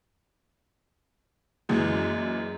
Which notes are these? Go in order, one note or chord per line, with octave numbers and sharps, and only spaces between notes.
F#2 A#2 E3 G#3